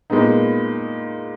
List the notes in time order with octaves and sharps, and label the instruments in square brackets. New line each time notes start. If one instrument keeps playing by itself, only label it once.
[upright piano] A#2 G#3 B3 D#4